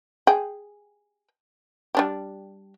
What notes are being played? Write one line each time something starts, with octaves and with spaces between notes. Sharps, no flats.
G#4 G5
G3 D4 G4